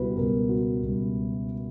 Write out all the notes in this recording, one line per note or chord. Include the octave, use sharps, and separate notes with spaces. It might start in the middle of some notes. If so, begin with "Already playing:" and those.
Already playing: C#2 B2 G3 E4 F#4 B4
C#2 B2 G3 A#4
F#4
C#2 B2 G3